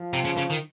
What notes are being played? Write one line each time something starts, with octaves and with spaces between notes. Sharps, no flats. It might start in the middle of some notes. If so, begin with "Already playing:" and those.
Already playing: F3
C3
C#3
C#3
D#3